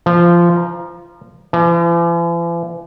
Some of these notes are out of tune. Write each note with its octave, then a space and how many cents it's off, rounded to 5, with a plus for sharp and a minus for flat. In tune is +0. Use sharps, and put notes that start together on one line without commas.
F3 -15
A#5 +20
E3 +45